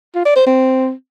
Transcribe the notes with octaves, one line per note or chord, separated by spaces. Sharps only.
F4
D5
C5
C4